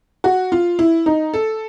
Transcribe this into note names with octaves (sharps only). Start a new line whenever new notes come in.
F#4
F4
E4
D#4
A4